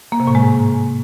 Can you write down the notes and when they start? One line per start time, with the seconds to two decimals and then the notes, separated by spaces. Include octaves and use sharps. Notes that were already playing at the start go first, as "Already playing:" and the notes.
0.12 A#3
0.20 C3
0.27 A2
0.35 G#3
0.43 G#2